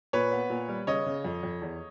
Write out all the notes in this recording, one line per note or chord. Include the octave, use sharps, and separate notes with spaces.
A#2 B4 C#5
B3
A#2
G3
C#3 C#5 D#5
C#3
F2
F2
E2